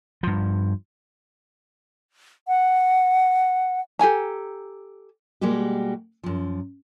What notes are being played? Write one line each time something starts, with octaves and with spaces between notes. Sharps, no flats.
G2 F3
F#5
G4 A4 G#5 A#5
B2 G3 G#3 A#3 F#4 G4
F#2 F3